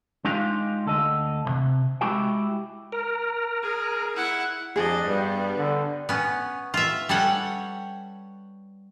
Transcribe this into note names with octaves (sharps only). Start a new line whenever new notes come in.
G#3 D4 D#4 F4 G4 F5
D2 A4 D#5
C#2 C3
G#3 E4 F#4 G4 G5
A#4
G#4
E4 F#5
F2 D4 G#4 D#5
G2 G3 B3
D3
B3 C#4
F4 E5
G3 C#4 A4 C#5 F#5